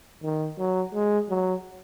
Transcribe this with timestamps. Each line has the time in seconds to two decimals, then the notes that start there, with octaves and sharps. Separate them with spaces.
0.23 D#3
0.58 F#3
0.94 G#3
1.29 F#3